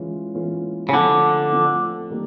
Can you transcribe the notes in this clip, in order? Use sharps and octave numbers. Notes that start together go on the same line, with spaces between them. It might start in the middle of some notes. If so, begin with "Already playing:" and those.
Already playing: E3 G#3 C#4 F4
E3 G#3 C#4 F4
C#3
D3 F3 A3 C4 F4
F3 A3 C4 F4
D#3 G3 A#3 D#4